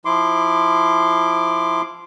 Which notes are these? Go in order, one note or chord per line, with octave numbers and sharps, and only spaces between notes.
F3 E4 C6 D6